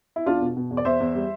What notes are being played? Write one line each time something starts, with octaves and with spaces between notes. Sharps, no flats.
E4
E2 D4 F4
B2
B2
E2
D5
E2 C5 E5
E2
G3